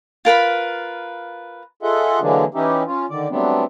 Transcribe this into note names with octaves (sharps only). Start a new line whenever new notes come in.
F4 A#4 B4 B5
F4 G#4 A4 D#5 E5 F#5
D3 E3 F#3 G#3 A#3 D4
E3 C#4 D#4 E4 G4
C#4 F4
D3 D#3 D5
F#3 G3 A3 B3 C4 D4